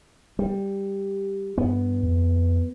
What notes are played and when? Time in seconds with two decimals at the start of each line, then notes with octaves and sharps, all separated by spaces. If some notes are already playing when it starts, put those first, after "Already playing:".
0.39 G3
1.58 G2 B3
2.03 F2